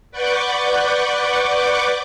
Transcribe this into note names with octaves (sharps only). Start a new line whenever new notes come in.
B4 D5 F#5 C#6 D6 G6